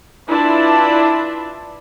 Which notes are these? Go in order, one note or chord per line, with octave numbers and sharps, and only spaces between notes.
D4 E4 F4 B4 D5 A5